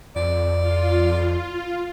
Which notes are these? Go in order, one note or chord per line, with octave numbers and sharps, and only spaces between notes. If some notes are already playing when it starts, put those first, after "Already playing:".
F2 D5
F4